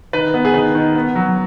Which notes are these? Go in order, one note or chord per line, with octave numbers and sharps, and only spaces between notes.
D#3 B4
B3
G#4
D#3 B4
D#3
B3
F#3